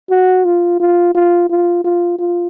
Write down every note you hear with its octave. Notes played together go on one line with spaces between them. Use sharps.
F#4
F4
F4
F4
F4
F4
F4